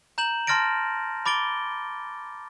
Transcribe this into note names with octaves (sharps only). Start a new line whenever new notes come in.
A#5 G6 E7 F#7
A5 C6 F6 A6 A#6 D7
B5 D6 A6 D7 G7